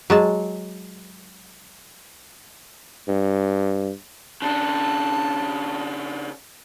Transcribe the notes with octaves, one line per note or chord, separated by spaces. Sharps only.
F#3 G#3 A5
G2
C#3 D4 A5